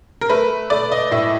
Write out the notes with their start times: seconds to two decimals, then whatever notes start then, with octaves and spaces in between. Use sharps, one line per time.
0.21 A#4
0.29 A3 B4
0.70 A3 D5
0.92 D#5
1.11 A2 E5